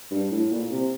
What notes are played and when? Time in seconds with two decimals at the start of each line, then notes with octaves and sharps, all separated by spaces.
0.11 G2
0.31 A2
0.50 A#2
0.71 C3